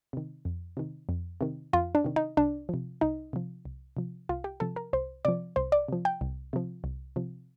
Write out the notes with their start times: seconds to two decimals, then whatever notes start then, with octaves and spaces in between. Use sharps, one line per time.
0.13 C3 D#3
0.45 F2
0.77 C3 D#3
1.09 F2
1.41 C3 D#3
1.73 F2 F4
1.95 D4
2.04 C3 D#3
2.16 D#4
2.37 C2 D4
2.69 C3 F3
3.01 C2 D#4
3.33 C3 F3
3.65 C2
3.97 C3 F3
4.29 C2 F4
4.44 G4
4.60 C3 F3 A4
4.76 A#4
4.93 C2 C5
5.25 C3 F3 D5
5.56 C2 C5
5.72 D5
5.88 C3 F3
6.05 G5
6.21 C2
6.53 C3 F3
6.84 C2
7.16 C3 F3